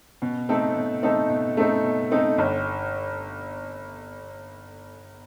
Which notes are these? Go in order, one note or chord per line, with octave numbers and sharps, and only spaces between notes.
B2
A3 C4 D#4 A4
B2
A3 C4 D#4 A4
B2
A3 C4 D#4 A4
B2
A3 C4 D#4 A4
G1